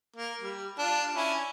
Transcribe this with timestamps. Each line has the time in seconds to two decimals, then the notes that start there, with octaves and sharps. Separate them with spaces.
0.16 A#3
0.41 G3
0.78 D4 F4
1.16 C#4 E4